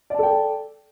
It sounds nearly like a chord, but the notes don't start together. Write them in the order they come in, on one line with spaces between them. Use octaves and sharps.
D5 A5 A4 G5